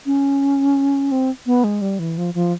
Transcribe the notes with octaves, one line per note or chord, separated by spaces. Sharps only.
C#4
C4
B3
G#3
G3
E3
F3
F3